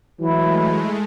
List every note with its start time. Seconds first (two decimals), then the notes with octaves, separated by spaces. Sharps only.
0.20 E3 F#3 G#3 A3 E4